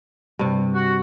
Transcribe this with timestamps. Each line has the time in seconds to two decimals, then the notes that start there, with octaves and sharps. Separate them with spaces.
0.39 G2 C3
0.75 F#4